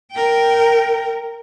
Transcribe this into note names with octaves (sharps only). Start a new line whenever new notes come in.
A#4 G5